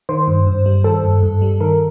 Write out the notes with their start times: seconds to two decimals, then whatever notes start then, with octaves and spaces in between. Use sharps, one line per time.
0.09 D#3 C5
0.28 G2
0.46 G2
0.66 G3
0.84 D#3 A4
1.04 G2
1.23 G2
1.42 G3
1.60 D#3 A#4